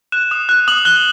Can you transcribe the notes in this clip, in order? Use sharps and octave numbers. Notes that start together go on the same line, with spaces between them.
F#6 E7
D#6
F#6
D#6 F#7
F#6 G7